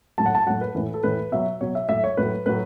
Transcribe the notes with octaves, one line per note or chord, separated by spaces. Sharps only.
A2 F#3 A5
F#5
A5
A2 F#3 F#5
B4
A2 E3 B4
A4
A2 E3 B4
B2 F#3 E5
B2 F#3 C#5
E5
A2 F#3 E5
C#5
A2 F#3 B4
A2 F#3 B4